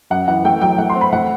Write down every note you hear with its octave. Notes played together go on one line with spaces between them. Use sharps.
F#2 F#5
E3 F#5
A3 G5
F#3 G5
A3 F#5
C6
C4
B5
A3 F#5